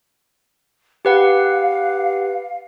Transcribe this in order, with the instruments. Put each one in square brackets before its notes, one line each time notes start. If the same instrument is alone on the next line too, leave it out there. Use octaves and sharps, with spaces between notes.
[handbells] G4 B4 F#5 [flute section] F5